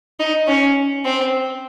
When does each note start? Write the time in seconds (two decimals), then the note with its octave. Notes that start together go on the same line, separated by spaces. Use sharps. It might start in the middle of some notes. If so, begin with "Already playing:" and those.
0.20 D#4
0.47 C#4
1.05 C4